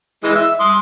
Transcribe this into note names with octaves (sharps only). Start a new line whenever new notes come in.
E3 G#3 D#5
E5
C6 D#6